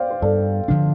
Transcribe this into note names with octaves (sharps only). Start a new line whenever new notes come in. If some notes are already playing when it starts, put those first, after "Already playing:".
Already playing: C5 D5 F5 G5
C5
G2 A4 D5
D3 F3 D4